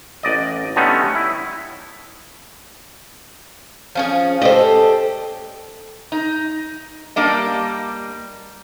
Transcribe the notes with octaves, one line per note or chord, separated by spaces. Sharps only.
A1 D5 D#5
D3 G3 A3 B3 C#4 D#4
E4
F3 C#4 G#4
G4 A4 C5 D5 D#5
D#4
G3 A#3 D4 D#5